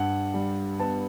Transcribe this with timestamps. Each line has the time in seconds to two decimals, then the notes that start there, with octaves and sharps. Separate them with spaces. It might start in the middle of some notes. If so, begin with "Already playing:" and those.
Already playing: G2 F#5
0.34 G3
0.80 B3 A5